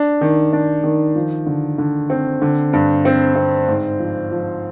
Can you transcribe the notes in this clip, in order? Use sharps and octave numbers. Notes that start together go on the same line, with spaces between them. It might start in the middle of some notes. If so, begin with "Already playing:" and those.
Already playing: D4
D#3
D4
D#3
F3
D3
D3
C4
D3
G2
C4
C4
G#2
F3
F3